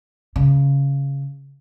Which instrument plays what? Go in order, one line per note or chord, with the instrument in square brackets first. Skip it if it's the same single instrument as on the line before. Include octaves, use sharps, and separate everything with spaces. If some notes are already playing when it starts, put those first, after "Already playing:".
[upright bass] C#3